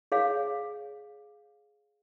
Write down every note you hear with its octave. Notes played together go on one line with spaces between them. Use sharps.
G#4 C#5 F5